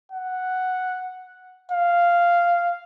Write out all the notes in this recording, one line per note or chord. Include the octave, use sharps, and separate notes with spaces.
F#5
F5